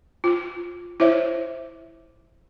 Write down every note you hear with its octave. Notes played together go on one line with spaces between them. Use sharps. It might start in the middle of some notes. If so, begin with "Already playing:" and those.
F4
E4 C5 C#5 E5